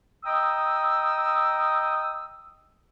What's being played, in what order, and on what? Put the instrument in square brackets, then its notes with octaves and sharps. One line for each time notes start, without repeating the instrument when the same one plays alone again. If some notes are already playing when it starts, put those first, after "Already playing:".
[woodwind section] D#5 G5 A#5 D#6 E6